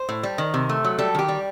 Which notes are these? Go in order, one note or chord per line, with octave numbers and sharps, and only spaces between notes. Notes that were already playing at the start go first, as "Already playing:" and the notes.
Already playing: C5
A2
G3
D#3
C3
A3
F#3
G3 A4
D#3 G4
G3